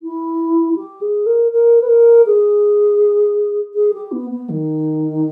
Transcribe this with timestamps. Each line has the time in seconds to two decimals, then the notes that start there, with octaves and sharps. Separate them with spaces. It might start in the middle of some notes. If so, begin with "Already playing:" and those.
0.02 E4
0.76 G4
1.01 G#4
1.26 A#4
1.51 A#4
1.81 B4
1.88 A#4
2.26 G#4
3.74 G#4
3.93 G4
4.12 B3
4.30 B3
4.49 D#3